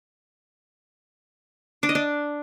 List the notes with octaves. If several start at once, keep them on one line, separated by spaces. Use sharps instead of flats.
D4
D#5
D4